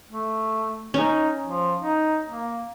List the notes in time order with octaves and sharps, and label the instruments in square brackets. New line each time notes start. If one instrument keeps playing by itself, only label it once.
[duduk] A3
[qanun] C#4 [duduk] D#4
[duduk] F3
D#4
A#3